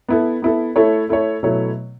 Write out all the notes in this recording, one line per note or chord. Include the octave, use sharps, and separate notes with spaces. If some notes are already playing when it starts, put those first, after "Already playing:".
B3 E4 A4
B3 E4 A4
A3 E4 A4 C#5
A3 E4 A4 C#5
B2 F#3 A3 E4 C#5